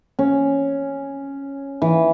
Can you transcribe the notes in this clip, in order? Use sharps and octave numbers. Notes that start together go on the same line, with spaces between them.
C#4
E3